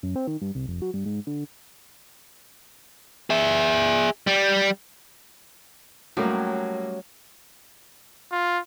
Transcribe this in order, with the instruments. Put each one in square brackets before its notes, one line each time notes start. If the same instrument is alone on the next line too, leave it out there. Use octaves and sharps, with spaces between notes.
[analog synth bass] F#2
C4
D#3
G2
C2
F1
F#3
G2
G#2
D3
[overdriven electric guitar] G#4 E5
G3
[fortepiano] A2 A#3 [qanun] F#3 [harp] G3 A3 C#4
[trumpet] F4